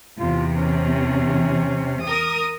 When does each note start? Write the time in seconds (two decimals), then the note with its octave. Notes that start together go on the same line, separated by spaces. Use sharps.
0.19 E2 C3 F4
0.51 C#4
2.05 A#4 D#6